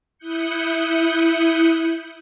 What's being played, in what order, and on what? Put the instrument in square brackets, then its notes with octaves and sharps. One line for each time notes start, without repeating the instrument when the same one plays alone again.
[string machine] E4 D#6 F#6 G6 C#7